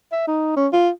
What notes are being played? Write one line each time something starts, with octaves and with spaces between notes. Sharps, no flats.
E5
D#4
C#4
F4